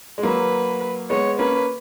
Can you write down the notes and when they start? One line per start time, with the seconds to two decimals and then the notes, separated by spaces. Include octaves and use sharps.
0.18 G#3
0.23 F#3 A#3 B4
1.10 G#3 B3 C#5
1.39 A#3 C#4 B4